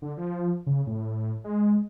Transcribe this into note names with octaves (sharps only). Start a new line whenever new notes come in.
D3
F3
C#3
A2
G#3